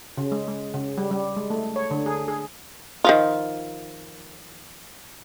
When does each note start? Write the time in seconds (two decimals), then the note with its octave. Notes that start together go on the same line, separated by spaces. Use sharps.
0.18 C#3
0.32 G#3
0.48 G#3
0.74 C#3
0.98 G3
1.11 G3
1.37 G#3
1.50 A3
1.76 C#5
1.91 D3
2.06 G#4
2.28 G#4
3.04 D#3 F3 F4